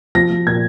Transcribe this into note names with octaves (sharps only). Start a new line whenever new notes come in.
F3 A#6
F3
A#2 G#6